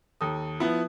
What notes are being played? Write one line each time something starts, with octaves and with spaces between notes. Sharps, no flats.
D#2 A4 D#6
F3 B3 E4